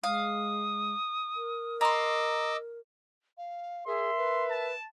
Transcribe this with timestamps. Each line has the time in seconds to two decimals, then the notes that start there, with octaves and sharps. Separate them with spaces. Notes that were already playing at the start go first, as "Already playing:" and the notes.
0.04 G#3 F5 D#6
1.36 A#4
1.81 D#5 A#5 C6 D6 E6
3.38 F5
3.87 G#4 A#4 E5 C6
4.17 B4
4.50 A5